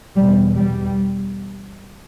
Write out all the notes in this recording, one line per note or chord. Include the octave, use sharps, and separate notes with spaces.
E2 B2 G3
G3